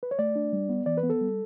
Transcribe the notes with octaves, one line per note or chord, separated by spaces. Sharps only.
B4
C#5
A3 D5
D4
G3
B3
E3 D5
B4
B3
A4
G3